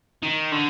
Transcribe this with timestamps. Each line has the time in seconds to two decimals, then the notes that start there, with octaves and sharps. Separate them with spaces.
0.23 D#3
0.52 D3